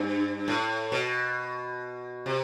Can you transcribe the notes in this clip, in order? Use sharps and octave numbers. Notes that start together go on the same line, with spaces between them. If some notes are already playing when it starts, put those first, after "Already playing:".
Already playing: G2
A2
B2
C3